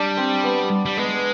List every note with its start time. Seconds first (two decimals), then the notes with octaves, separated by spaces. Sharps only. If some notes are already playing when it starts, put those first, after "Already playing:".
Already playing: G3 D4
0.17 C4
0.44 B3
0.86 G3
0.97 G#3 B3